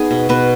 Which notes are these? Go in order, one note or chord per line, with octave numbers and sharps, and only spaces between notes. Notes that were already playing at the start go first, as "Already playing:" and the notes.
Already playing: B3 D#4 G#4
B2
B2 B4